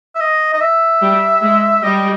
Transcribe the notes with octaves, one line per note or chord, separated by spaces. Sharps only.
E5
D#5
D#5
E5
G3
G#3
G3 D#5